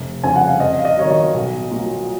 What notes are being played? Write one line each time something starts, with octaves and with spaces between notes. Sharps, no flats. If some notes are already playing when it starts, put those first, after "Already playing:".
Already playing: F1
F2 C#3 G#5
F#5
F5
F2 D#5
F5
D#5
D#3 F#3 C#5
D#5
B1
A#2 F#3